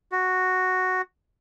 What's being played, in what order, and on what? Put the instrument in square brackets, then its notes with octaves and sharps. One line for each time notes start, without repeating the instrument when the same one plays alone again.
[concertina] F#4